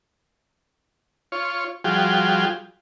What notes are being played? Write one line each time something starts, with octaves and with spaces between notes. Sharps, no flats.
F4 C#5
F3 G3 F4 F#4 G#4 G5